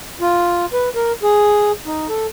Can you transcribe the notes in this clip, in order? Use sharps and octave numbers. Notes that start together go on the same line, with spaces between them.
F4
B4
A#4
G#4
D#4
A4